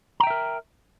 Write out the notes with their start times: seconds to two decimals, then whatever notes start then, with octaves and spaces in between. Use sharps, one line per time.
0.20 A#5
0.23 G5
0.27 E5
0.30 A#4